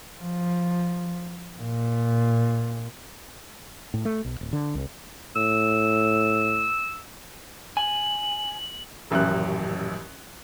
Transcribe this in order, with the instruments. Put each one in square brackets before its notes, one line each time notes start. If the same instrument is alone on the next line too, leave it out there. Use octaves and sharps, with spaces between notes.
[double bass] F3
A#2
[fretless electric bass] A2
A3
B1
D1
D3
C2
[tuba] A2 [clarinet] E6
[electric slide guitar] G#5 [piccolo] F#7
[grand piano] D#1 A1 F#2 F#6